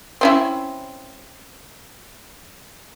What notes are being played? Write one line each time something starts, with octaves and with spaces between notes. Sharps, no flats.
C4 C#4 E4